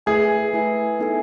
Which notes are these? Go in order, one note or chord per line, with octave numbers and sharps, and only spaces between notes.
A3 E4 G#4 B4 E5 G#5
A3 E4 B4 E5 G#5
B3 D#4 A4 E5 G#5